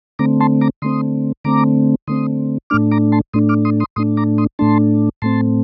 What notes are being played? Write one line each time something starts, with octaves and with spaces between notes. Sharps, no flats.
D3 A3 C4 A#5 D6
A5 C6
A#5 D6
D3 A3 C4 C6 D#6
D3 A3 C4 A#5 D6
D3 A3 C4 C6 D#6
A2 A3 D4 D6 F6
A#5 D6
A5 C6
A2 A3 D4 C6 D#6
D6 F6
C6 D#6
C6 D#6
A2 A3 D4 C6 D#6
A#5 D6
C6 D#6
A2 A3 D4 A5 C6
A2 A3 C4 A5 C6